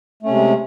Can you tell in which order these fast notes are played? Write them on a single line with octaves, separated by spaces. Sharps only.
A3 C#4 C3 G#3